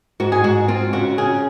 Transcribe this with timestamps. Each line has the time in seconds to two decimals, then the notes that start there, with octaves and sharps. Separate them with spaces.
0.20 G#2 F#4
0.32 G#4
0.44 G#2 F#4
0.68 C4 F4
0.93 C#3 F#4
1.18 C#3 G#4